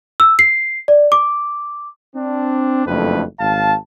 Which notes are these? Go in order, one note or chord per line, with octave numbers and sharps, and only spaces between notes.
E6
C7
D5
D6
C4 D4
F#1 F2 A3 D4 B4
G#1 F5 A5